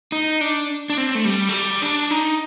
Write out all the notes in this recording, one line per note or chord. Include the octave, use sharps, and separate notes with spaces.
D#4
D4
D4
C4
A3
G3
A3
G3
D4
D#4